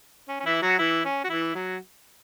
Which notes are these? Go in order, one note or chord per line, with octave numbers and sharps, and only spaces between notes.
C#4
C#4
E3 E4
F#3 F#4
E3 E4
C#4
F#4
E3 E4
F#3 F#4